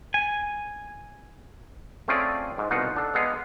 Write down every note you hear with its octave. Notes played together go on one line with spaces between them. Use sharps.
G#5
A3 C4 C#4 F4 G#4 D5
G#2
C2 B2 D#4 F4 F#5
D4 A4
G#3 B3 G#4 F5 F#5